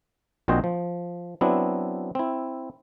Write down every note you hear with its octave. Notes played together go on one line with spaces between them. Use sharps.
A#1 A#2 C4 F#4 C5 D#5
F3
F#3 B3 C4 D4 E4
C4 E4